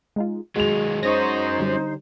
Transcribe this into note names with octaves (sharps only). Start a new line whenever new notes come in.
G#3 D#4 F4
D#3 F#3 G#3 F#4 F7
C#4 D#4 F#4 C5 C#6 D#6 A#6
D3 G3